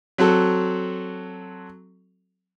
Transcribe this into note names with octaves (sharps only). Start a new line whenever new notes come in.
F#3 C4 F#4 A4